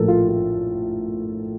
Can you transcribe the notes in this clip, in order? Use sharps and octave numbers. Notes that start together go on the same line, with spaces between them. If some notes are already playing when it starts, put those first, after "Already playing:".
Already playing: A#1 A2 F3 A4 A#4
F4
F4